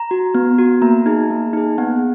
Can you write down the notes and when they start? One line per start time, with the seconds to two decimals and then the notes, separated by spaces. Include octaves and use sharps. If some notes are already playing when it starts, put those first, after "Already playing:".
Already playing: A#5
0.11 F#4
0.35 B3
0.58 F#4
0.82 A#3 A#5
1.06 D#4 G#4
1.30 A#3
1.53 D#4 G#4
1.78 B3 F#5